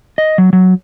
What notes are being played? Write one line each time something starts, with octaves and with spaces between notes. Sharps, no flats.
D#5
F#3
F#3